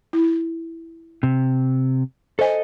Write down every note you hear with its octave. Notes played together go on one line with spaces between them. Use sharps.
E4
C3
A4 C5 D#5 G#5